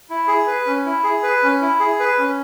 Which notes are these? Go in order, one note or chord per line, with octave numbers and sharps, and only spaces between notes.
E4
G#4
B4
C#4
E4
G#4
B4
C#4
E4
G#4
B4
C#4